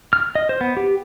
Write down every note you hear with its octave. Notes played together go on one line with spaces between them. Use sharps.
F6
D#5
C5
B3
G4